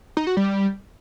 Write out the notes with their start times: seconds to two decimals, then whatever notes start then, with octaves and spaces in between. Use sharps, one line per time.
0.17 D#4
0.27 F#4
0.37 G3